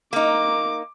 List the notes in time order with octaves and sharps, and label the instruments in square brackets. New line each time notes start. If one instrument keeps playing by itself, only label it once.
[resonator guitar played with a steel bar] A#3 D#4 [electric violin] D6